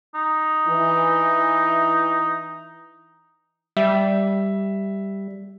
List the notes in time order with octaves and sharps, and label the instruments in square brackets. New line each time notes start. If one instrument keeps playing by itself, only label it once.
[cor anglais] D#4
[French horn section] E3
[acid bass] G3 [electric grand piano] E5